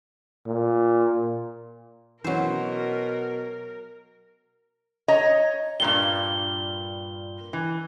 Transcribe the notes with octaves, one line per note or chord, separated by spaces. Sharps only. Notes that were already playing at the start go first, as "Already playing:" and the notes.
A#2
B2 E3 F#3 C#4 A#4 C5
C#5 D#5 A#5
G2 A#2 G3 G7
E3